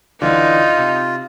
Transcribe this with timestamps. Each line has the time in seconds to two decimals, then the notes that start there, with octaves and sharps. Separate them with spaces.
0.22 D3 E3 D4 D#4 F4
0.77 C3